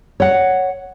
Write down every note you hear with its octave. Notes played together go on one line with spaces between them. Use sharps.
C#5 F#5